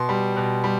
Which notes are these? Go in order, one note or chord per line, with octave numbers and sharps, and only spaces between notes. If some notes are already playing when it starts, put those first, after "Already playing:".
Already playing: B2 C6
G3
B2
G3